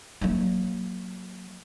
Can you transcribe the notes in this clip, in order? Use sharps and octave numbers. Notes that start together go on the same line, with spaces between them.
F#3 A#3